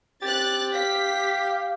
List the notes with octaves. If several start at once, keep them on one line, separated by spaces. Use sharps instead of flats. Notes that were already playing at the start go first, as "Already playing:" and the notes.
C4 G4 F#6 A6
F5 B6